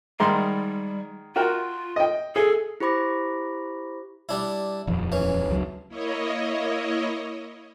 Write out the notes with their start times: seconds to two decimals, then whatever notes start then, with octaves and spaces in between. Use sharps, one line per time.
0.20 G#2 D#3 G3 C6
1.36 F4 F#4 A#4 G5
1.96 D#5 G5
2.36 G#4 A4
2.80 E4 G4 C5 B5 D6 A#6
4.29 G3 D4 E4
4.87 D#1 F2
5.12 E3 C#4
5.49 C#2 F#3
5.88 A#3 E4 C#5 D#5